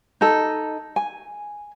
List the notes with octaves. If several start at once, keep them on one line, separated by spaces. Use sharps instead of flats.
D#4 A4
G#5